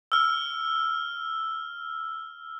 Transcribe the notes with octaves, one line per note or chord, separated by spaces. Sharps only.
E6 F6